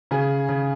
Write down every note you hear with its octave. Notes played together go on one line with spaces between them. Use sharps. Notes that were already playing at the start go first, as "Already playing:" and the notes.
C#3 G#4
C#3